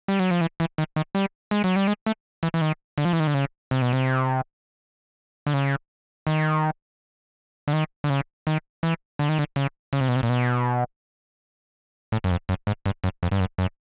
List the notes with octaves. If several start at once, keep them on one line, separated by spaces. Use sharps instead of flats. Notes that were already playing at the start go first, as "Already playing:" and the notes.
G3
F#3
F3
E3
E3
D#3
D#3
G3
G#3
F#3
G3
G#3
A3
E3
E3
D#3
D3
F3
E3
D#3
D3
C#3
C3
B2
C3
D3
C#3
D#3
D3
D#3
D3
C#3
D#3
E3
D3
D#3
D3
C#3
C#3
C3
B2
C3
A#2
B2
A2
F#2
F2
F#2
G#2
G2
F#2
F2
G2
F#2
F#2